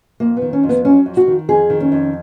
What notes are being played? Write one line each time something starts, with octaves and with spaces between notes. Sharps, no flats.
F2 A#3
B3
D#3
C#4
F2
B3
F#3 C#4
F2
F#4
D#3
F2 G#4
D#3
C#4
F2